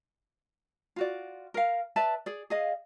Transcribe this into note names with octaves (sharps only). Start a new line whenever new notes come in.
F4 F#4 D5
A#4 F5
B4 D5 E5 A5
G#4 D5
G#4 D#5 F5